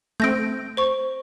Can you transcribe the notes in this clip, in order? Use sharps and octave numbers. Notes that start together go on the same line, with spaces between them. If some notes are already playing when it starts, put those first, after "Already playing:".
A3 C4 G6 A#6 D7
C5 C#6